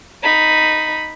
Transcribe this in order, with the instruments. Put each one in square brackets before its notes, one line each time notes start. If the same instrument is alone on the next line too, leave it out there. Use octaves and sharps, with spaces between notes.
[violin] D#4 B5